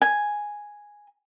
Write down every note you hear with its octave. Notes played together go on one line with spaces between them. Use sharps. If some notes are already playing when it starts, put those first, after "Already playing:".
G#5